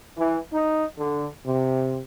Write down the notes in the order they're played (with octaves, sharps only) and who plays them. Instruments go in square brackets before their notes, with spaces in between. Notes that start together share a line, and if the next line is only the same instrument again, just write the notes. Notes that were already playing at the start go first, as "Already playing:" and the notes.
[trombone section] E3
D#4
D3
C3